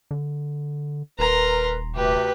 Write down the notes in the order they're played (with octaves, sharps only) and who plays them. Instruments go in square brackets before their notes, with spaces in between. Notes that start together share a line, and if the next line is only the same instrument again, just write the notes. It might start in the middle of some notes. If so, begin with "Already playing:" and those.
[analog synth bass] D3
[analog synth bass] D#1 [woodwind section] A#4 B4 [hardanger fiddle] A#5 C6
[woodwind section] D2 C3 [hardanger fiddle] G4 B4